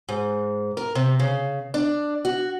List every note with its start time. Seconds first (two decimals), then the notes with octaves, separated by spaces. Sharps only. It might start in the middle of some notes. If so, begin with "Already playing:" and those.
0.09 G#2
0.77 A#4
0.95 C3
1.19 C#3
1.74 D4
2.25 F#4